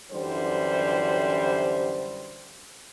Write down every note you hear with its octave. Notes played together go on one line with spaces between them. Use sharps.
F#2 D3 E3 G3 G4 C5